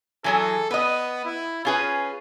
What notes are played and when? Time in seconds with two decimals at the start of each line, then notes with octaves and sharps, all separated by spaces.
0.24 E3 F#3 G#4 A4
0.71 B3 B4 D#5
1.25 E4
1.65 C#4 F4 G#4 B4